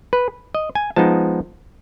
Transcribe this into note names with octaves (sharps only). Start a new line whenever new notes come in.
B4
D#5
G#5
F3 G#3 B3 D#4 A5